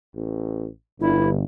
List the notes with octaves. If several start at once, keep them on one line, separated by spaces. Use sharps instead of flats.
A1
G1 G2 E4